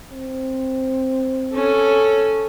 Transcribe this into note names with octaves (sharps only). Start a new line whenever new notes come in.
C4
C#4 A4